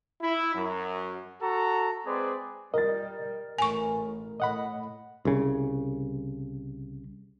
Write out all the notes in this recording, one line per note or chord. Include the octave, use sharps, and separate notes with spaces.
E4
F#2
F#4 A4 A#5
G#3 C4 G#4 B4 C5 D5
G3 A#4 D#5 A6
A1 G#5 C#6
A2 D#5 F#5 B5
C2 C#3